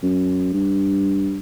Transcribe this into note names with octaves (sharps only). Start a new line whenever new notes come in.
F#2
G2